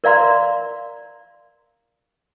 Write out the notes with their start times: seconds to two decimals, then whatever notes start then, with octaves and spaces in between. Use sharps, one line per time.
0.04 A#4 D5 F5 A#5 C6